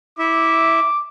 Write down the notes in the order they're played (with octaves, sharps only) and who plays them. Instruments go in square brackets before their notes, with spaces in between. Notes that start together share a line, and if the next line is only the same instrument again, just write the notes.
[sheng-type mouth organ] E4 E5 [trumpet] D6